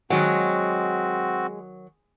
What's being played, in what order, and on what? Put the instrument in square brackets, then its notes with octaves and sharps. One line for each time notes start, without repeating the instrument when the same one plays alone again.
[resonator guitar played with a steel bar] D#3 F#3 F#5 [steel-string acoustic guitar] G#3 [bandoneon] C4 F#4